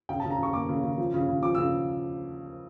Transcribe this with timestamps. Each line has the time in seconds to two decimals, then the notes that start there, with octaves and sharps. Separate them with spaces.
0.09 C#3 G5
0.20 A5
0.24 C#3
0.31 A#5
0.39 C#3 C#6
0.53 A#3 D6
0.69 C#3
0.84 C#3
0.98 F3
1.14 C#3
1.28 C#3
1.43 F3 D6
1.55 E6
1.58 C#3